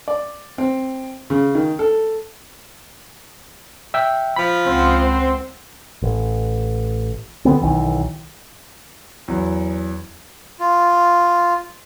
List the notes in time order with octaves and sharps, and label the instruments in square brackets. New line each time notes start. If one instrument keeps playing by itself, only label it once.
[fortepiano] D5
C4
C#3
D#3
A4
[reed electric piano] E5 G5
[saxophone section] F3 [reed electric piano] B5
[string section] C#2 C5 F#5 [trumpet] C4
[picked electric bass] A1
D3 B3 C4
B1 D#3 E3
[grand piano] E2 F#3
[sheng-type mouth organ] F4